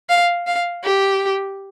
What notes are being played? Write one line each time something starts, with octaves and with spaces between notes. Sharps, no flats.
F5
F5
G4